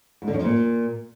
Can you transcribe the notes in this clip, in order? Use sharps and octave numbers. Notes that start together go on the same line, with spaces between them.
G#2
D3
F#2
F2
A#2